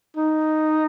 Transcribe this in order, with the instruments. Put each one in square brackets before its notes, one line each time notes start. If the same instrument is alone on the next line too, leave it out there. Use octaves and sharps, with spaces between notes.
[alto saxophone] D#4